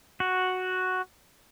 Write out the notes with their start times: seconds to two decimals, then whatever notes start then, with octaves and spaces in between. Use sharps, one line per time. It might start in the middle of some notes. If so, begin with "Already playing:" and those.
0.20 F#4